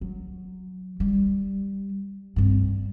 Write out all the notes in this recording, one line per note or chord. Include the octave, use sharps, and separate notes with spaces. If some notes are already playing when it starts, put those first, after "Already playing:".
F#3
G3
G2 C4